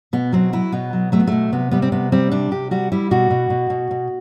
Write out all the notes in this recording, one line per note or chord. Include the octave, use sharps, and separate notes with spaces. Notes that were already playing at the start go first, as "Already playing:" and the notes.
B2 B3
F#3 C4
F#3 E4
B2 B3
F#3
F#3 A3
B3
B2 A3
C3 B3
G3 B3
C4
C3 B3
G3 C4
C3 D4
C3 G4
G3 F#4
G3 E4
B2 F#4
B2
B2
B2
B2